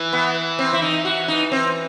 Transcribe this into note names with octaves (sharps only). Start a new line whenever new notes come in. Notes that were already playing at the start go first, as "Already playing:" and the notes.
Already playing: E3
B3
C4
E4
D#4
F#4
D#4
C4